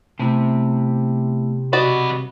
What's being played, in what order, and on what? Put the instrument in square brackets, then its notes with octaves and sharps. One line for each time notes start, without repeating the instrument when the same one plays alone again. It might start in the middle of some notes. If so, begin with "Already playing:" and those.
[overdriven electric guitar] C3 [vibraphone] A3 B3 E4
[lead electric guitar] F#3 B4 [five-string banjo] F#4 D5 D#5